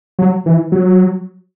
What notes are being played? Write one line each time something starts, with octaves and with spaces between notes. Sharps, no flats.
F#3
E3
F#3